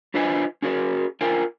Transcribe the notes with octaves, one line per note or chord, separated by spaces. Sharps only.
D4 F4 B4 C5 D#5 G#5
C#4 F#4 G#4 A#4
F4 A#4 C5 G5 G#5